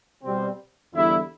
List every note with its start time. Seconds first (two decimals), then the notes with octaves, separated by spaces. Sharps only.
0.23 B2 G3 C4
0.94 E2 D3 G3 B3 E4